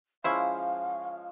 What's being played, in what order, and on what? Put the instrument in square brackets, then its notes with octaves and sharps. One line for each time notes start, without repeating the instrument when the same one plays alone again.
[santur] F3 G#3 C#4 [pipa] E4 C5 [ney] F5